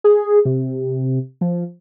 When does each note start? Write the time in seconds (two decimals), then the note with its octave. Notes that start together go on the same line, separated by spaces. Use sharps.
0.04 G#4
0.45 C3
1.41 F3